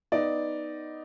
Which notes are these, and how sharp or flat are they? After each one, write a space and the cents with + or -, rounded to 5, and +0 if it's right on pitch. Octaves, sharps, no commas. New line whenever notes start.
B3 +0 D#4 +0 D5 +0